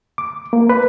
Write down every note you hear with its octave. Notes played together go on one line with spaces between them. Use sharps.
D6
A#3
B4